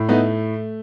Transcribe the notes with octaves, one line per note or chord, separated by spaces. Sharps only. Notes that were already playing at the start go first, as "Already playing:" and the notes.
Already playing: A2
A3 B3 D#4